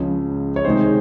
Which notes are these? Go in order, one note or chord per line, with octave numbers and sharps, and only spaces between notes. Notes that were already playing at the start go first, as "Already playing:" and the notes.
Already playing: C#2 C#3 F3
C#5
C3 D#3 G#3 D#4 C5